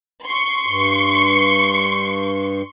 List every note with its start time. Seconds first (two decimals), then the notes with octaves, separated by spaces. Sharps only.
0.25 C6 C#6
0.67 G2